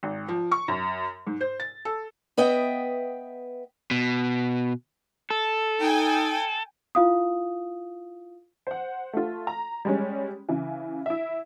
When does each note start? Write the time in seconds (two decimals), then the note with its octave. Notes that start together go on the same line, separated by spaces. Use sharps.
0.03 G#1
0.28 F3
0.51 C#6
0.68 F#2
1.27 G#2
1.41 C5
1.60 A6
1.85 A4
2.37 B3 B4 D#5 E5 G5
3.91 B2
5.30 A4
5.80 D#4 G5 G#5
6.95 E4 F4 F5 D#6
8.67 C5 F#5
9.13 A3 F4
9.47 A#5
9.85 G3 G#3 C#4
10.49 C#3 E3
11.06 E4 E5